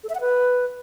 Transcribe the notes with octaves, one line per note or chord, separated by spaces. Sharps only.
A4
E5
F#5
B4